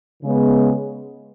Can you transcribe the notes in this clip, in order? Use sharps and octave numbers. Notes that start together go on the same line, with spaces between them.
C#3 G#3 B3